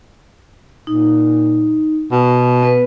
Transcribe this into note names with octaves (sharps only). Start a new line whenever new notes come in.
A#2 D#4
B2
B3 B4